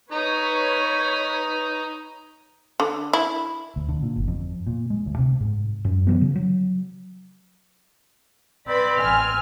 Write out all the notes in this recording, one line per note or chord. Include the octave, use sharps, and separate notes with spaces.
D#4 B4 C#5 A#5
D3
E4
D2
D3
A#2
G1
F2
A#2
G#3
D2
C3
G#2
F#2
E3 F#3 B3
C#3
F#3
C4 B4 D5 B5
A1 G#5 F6